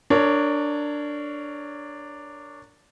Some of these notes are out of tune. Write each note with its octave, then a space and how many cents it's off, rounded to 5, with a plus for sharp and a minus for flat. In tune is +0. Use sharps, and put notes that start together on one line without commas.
D4 +0 A#4 -25 C#5 +10